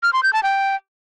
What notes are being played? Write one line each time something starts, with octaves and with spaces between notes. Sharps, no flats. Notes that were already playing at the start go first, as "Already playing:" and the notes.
F6
C6
G6
A5
G5